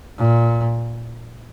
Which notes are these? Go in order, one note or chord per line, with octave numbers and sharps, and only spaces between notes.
A#2